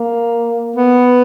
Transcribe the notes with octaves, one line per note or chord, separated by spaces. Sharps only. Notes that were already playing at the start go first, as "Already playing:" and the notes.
Already playing: A#3
B3